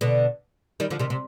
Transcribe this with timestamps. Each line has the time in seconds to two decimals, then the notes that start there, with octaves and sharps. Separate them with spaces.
0.01 B2 D3
0.80 D#3 G3
0.90 D3 F3
0.99 C3 D#3
1.10 C3